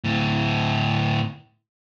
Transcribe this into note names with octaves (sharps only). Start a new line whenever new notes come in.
D2 A2